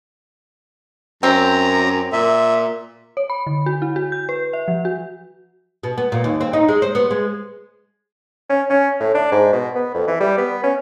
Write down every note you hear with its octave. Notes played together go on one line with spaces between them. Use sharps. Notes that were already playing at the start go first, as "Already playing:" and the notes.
F#2 C4 A#5
A#2 E5
C#5
B5
D3
F#4
E4
F#4
G6
B4
E5
F3
F#4
B2
B3
A#2
D#2
C4
D#4
G#3
C5
B3
G#3
C#4
C#4
A2
D4
G#2
B2
B3
F2
E3
G3
B3
C#4